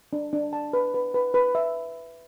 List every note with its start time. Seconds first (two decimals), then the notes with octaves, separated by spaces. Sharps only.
0.13 D4
0.33 D4
0.53 A5
0.73 B4
0.94 B4
1.14 B4
1.34 B4
1.55 E5